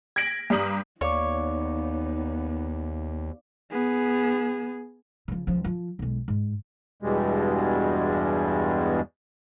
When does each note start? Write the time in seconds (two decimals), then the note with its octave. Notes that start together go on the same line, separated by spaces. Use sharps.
0.16 G#6 A#6 B6 D7 F#7
0.50 G2 G3 A#5 D#6 F#7
1.01 D#2 B3 D#4 C#5 D5 F5 D6
3.71 B3 G#4
5.28 C#3 F3
5.47 C#2 F3
5.64 F3
5.99 B1 G#3
6.28 G#2
7.02 E2 G2 B2 G3 G#3